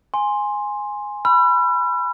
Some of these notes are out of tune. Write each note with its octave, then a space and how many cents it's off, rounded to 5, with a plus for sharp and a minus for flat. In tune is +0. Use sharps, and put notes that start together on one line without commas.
G#5 -5 C6 +5
B5 +0 E6 +45